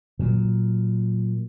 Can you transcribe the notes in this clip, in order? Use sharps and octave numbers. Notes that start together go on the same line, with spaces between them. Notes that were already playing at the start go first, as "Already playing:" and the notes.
A#2 F#3